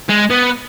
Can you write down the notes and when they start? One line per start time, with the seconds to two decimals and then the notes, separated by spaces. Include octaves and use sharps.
0.09 G#3
0.30 B3